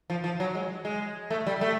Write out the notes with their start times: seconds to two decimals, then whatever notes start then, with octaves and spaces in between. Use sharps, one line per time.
0.10 F3
0.24 F3
0.40 F#3
0.55 G#3
0.85 G#3
1.30 A3
1.47 G3
1.61 A3